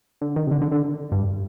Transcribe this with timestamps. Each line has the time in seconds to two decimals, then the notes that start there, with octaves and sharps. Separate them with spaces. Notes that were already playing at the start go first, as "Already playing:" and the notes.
0.21 D3
0.36 D#3
0.47 C3
0.51 D3
0.61 D3
0.72 D3
1.12 G2